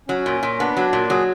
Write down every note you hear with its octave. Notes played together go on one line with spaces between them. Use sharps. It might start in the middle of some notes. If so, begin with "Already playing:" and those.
F#3 C#4
A#2
A#2
B3 D4
F#3
A#2
F#3 G#4